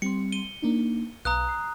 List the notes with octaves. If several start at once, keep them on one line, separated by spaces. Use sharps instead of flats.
G3 C4 C6 C#7
D#7 G7
A#3 D4 D#4
B1 B4 F5 A#5 D#6 F#6
C7